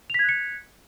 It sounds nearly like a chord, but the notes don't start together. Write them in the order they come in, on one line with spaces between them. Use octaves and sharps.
F7 B6 G#6 F#6 C#7